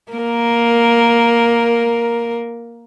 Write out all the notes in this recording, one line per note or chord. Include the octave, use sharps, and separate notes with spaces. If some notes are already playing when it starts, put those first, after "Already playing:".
A#3 A#4